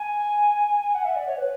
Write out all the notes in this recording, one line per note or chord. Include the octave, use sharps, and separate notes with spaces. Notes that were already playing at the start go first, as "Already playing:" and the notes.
Already playing: G#5
F#5
E5
D5
C#5
B4